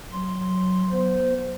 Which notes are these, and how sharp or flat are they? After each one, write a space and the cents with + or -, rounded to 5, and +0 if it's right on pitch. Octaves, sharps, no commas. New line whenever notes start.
F#3 +0 C6 +0
B3 -20 C5 -15